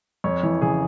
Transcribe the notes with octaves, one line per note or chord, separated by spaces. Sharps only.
F2 C#5
E3
C#3 G#4